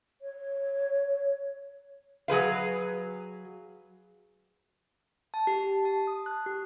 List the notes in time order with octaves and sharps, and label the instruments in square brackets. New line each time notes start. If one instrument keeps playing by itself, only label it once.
[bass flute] C#5
[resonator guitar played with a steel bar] F#3 G#4 B4 F5
[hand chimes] A5
G4
A5
D#6
F#6
G4